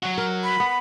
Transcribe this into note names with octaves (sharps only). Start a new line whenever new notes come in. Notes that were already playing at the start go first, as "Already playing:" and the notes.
F#3 F#4
A#4
B5
B3